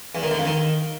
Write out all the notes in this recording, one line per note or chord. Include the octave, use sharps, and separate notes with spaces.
E2
D#3
D3
F2
D#3